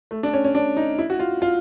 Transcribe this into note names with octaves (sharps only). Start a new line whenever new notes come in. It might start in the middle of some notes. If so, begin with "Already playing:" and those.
A3
D4
C#4
C#4
D4
D#4
E4
F#4
F4
F4